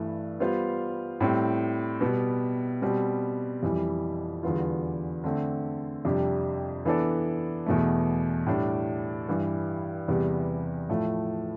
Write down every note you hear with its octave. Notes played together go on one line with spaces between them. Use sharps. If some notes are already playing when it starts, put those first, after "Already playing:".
Already playing: G2 E3 A3 E4
G3 B3 F4 C5 F5
A2 G3 C4
B2 G3 B3
B2 G3 C4
F2 E3 G3
E2 D3 G3 B3 F4
D3 A3 C4
F2 C3 G3 D4 G4
E3 B3 D4 A4 D5
E2 B2 A3
A2 G3 D4
G2 E3 G3
E2 C3 G3 B3
A2 F3 A3